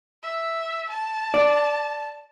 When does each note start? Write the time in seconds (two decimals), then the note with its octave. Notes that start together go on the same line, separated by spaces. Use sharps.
0.23 E5
0.89 A5
1.34 D5